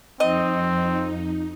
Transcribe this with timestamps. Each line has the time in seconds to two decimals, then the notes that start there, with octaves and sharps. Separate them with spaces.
0.20 F2 C4 D#4 D#5